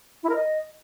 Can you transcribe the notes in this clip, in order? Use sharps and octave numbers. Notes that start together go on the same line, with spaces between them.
E4
A#4
D#5